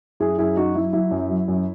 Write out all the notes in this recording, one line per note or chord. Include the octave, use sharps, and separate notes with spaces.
F#2 E4 G#4
F#2 E4 G#4
F#2 D#4 F#4
F#3 E4
F#3 E4
F#2
F#3
F#2